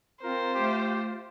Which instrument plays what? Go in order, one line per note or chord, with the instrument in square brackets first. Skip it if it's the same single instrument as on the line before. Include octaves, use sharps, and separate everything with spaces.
[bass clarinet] C4 [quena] F4 [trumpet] A#4 [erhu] C5
[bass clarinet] A3 [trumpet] G4